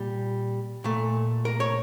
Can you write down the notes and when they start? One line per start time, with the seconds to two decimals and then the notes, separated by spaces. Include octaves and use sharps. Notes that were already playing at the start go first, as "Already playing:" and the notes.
Already playing: A#2 G3
0.84 A#2 A3
1.45 A#4
1.60 C#5